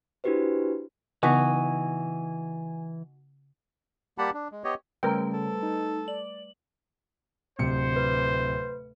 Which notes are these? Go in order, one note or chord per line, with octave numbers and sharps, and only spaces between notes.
D4 E4 F#4 G4 B4 C5
C#3 E3 B3 D#4 F#4 G#5
G3 A#3 G4 F#5 A5 B5
D4
G#3
B3 G4 C#5 D#5
C#3 G3 A3 A#4 B4 G5
A4
D#4
D5 F#7
D1 C3 C5 C#7
B4